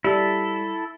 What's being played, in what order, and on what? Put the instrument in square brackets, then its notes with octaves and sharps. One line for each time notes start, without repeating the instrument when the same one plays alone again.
[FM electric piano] G3 [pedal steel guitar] E4 A4